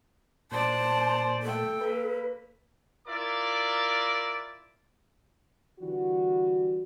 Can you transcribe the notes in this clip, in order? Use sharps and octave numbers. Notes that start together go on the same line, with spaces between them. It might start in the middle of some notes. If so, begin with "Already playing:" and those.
A#2 C5 D5 A5
A3 A4 G5
A#3 B4
E4 F4 A#4 D5 D6
D3 E3 G3 F#4